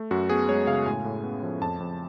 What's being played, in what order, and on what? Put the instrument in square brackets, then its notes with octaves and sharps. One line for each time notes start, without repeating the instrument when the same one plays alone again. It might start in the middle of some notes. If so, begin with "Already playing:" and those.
Already playing: [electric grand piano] A3
F#2 F#4
B3 G#4
G#3 C#5
C#3 F5
A2 G#5
A2
B3
F3
F2 A5
F2